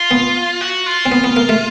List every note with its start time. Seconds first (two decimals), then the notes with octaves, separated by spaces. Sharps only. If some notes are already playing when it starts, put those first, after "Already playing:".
Already playing: F4
0.11 B3
0.61 F#4
0.86 F4
1.06 C4
1.11 B3
1.24 B3
1.36 A#3
1.49 A3